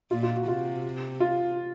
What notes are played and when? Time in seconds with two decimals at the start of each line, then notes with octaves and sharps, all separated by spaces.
0.11 A#2 F4
0.23 F4
0.36 F#4
0.48 C3 F4
1.20 F4